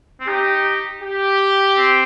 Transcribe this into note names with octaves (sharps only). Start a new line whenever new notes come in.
C4
D#4 G4
G4
C4